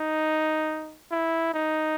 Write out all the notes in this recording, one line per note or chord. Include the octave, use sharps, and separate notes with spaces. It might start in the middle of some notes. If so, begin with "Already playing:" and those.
Already playing: D#4
E4
D#4